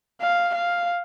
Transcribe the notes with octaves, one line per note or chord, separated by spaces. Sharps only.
F5
F5